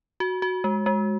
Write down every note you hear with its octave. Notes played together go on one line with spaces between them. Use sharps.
F#4
F#4
G#3
G#3